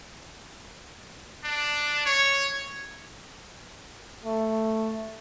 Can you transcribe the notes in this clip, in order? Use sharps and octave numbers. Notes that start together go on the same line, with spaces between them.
D4
C#5
A3